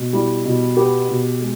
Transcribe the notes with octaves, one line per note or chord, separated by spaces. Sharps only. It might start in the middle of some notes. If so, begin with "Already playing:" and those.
Already playing: B2
G3 E4
B2
B3 G4
B2
G#3